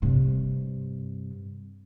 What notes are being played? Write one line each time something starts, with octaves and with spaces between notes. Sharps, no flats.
G2 C3